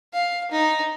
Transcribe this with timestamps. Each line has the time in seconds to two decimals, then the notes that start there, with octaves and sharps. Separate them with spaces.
0.13 F5
0.51 D#4